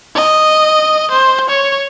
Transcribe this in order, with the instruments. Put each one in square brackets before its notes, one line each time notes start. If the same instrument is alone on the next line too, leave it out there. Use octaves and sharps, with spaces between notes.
[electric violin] D#5
C5
C#5